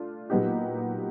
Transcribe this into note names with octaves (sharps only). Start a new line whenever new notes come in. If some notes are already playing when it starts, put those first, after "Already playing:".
Already playing: A3 D4 F4
A#2 F#3 B3 D#4 G4